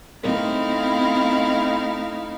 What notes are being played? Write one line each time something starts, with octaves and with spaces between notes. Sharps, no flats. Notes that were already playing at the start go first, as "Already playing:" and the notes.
A3 C4 D#4 E4 F5